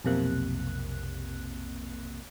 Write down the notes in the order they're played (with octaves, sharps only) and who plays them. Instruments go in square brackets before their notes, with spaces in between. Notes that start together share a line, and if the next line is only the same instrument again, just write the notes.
[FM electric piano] B1 F2 C3 A#3 F#6